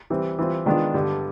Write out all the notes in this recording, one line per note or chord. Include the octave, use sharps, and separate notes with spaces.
E3 G3 C4
E3 G3 C4 F4
D#3 G#3 B3 D4 F4
G2 D3 G3